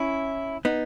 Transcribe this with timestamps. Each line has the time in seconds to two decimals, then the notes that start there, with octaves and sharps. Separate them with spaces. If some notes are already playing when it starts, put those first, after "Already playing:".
Already playing: C#4 E4
0.65 B3 D#4